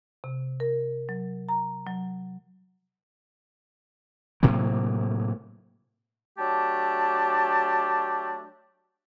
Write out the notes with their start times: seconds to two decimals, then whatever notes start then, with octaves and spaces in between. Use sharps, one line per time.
0.24 C3
0.60 A#4
1.09 F#3
1.49 A#5
1.87 F#3
4.43 A2 C3 F#3 A#3
6.39 F#3 A3 D4 G4 A5